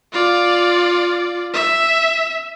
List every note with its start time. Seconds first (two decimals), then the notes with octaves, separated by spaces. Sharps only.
0.12 F4 D5
1.54 E5